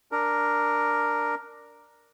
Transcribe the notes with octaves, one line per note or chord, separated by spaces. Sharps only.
D4 A#4